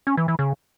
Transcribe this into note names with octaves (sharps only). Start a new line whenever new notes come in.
C#4
E3
E3
C#3